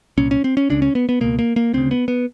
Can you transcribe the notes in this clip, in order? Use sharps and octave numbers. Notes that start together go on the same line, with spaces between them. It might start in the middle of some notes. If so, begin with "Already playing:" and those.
C2 A#2 C#4
C#4
C4
C#4
C#2 C#3 D4
C#4
B3
B3
C#2 B2 A#3
A#3
A#3
D2 C#3 C4
B3
B3